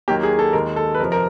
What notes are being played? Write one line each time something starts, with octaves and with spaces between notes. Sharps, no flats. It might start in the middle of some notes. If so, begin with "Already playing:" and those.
D#2 D#3 F#3 A#3 G4
G#4
A4
D#2 D#3 G#3 A#4
A4
B4
F2 C3 F3 A#4
A#4